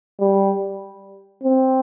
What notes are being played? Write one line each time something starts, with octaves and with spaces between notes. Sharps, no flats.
G3
C4